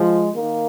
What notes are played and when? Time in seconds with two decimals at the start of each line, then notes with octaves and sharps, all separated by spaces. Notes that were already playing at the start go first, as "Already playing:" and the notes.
Already playing: F3 G#3
0.36 D#3 A#3